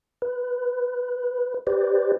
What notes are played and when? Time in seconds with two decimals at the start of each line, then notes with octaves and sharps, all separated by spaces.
0.22 B4
1.67 G4 B4 C5 D5